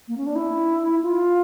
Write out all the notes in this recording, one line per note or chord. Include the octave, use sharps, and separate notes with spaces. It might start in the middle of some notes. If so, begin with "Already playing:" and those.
A#3
C#4
D4
E4
F4